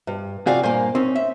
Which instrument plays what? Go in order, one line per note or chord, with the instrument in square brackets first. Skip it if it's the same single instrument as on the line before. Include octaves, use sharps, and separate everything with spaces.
[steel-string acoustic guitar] G2
[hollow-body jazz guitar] C3 F#4 G#4 [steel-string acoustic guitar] F4 D5 F5
[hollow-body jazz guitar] G2 C5 G#5 [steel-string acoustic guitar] A#2 A#3
[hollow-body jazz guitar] C4 D#4 [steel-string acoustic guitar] C#4
[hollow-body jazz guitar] E5